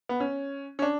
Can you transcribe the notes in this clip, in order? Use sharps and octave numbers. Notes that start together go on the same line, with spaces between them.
B3
C#4
C#4
D4